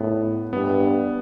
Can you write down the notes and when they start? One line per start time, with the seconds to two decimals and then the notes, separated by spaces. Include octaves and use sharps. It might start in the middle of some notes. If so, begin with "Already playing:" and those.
Already playing: A2 B3
0.53 G2 B3